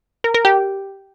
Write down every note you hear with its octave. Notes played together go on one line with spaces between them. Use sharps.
A#4
A#4
G4